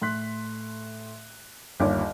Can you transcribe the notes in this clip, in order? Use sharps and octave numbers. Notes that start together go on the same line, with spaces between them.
A2 C6 F#6 B6
G1 D#2 F4 C#5 D6